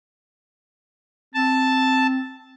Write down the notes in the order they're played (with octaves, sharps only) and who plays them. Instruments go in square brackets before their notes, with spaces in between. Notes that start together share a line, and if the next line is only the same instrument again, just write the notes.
[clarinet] C4 [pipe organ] A5